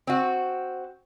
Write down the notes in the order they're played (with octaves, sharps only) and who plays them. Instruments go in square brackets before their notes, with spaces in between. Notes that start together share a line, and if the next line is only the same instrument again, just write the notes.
[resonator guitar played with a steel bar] C4 F#4